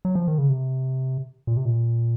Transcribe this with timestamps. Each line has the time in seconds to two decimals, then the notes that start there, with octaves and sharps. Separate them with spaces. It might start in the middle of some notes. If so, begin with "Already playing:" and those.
0.05 F#3
0.15 F3
0.27 D#3
0.38 C#3
0.50 C3
1.47 A#2
1.57 C3
1.65 A#2